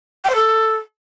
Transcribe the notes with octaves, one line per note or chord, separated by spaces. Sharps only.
G5
C5
A4